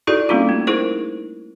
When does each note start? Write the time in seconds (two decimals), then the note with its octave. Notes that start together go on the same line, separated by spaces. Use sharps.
0.07 D#4 E4 F#4 G#4 A4 D5
0.29 G3 A#3 C4 C#4 D#4 F4
0.49 A3
0.67 D#4 E4 G#4 A#4 C5